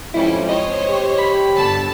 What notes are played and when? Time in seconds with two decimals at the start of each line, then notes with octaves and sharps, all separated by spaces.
0.14 F2 G#2 G3 C#4 E4
0.49 C5 C#5 D#5
0.89 G4
1.19 B5
1.54 G1 D3 A5